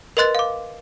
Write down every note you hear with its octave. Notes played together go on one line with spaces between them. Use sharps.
A#4 B4 D#5 C6 F#6 A6
F5 D6